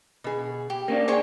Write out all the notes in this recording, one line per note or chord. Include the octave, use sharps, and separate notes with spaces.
B2 G#4
G4
A#3 B3 C#4 D4
D4 G#4 C5 C#5 G5 G#5